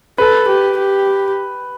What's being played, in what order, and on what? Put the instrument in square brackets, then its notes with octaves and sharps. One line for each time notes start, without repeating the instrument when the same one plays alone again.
[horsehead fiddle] A4 [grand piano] B4
[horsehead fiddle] G4
G4